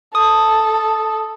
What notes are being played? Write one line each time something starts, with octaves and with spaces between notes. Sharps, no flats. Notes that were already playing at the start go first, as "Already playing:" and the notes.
A4 D#6